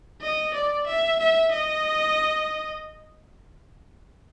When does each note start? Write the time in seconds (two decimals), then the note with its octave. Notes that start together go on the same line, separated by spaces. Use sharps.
0.21 D#5
0.54 D5
0.87 E5
1.19 E5
1.52 D#5